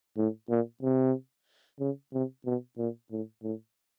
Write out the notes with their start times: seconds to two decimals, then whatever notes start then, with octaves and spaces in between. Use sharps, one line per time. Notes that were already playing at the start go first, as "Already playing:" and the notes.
0.17 A2
0.50 A#2
0.83 C3
1.79 C#3
2.13 C3
2.45 B2
2.78 A#2
3.11 A2
3.43 A2